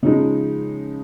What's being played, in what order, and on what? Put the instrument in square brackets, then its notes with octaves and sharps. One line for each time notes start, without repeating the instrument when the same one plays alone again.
[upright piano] C#3 F3 G#3 D#4